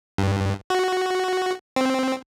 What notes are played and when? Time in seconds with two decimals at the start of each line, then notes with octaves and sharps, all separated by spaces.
0.18 G2
0.70 F#4
1.76 C4